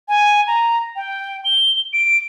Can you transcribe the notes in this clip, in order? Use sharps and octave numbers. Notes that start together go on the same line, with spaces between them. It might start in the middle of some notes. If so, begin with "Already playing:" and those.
G#5
A#5
G5
G7
D7